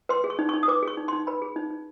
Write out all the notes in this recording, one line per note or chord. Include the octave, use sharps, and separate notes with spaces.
B4 C6
G#4
C#6
D#4
D#4 C#6
D#6
B4 D6
G#4 C#6
D#4
D#4 C6
B4 B5
G#4
D#4
D#4